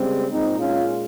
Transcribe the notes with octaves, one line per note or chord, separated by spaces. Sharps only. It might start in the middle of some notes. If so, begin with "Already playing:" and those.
Already playing: C#3 G3 G#3 C4
A#2 G#3 C4 D#4
C#4 F4